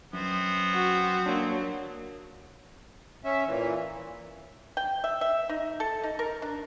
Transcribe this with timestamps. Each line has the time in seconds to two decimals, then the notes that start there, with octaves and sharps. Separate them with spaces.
0.13 F#2 B3 C4
0.74 F#4
1.26 F#3 A#3 D4
3.25 C#4 E5
3.47 A#2 E3
4.77 G5
5.04 E5
5.21 E5
5.49 D#4
5.80 A4
6.03 D#4
6.19 A#4
6.42 D4